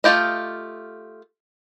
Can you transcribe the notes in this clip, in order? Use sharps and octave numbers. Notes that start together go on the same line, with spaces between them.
A3 C4 F4 G4 D#5